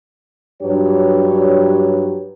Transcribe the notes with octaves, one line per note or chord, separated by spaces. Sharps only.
G2 F#3 D4 G4 B4 C#5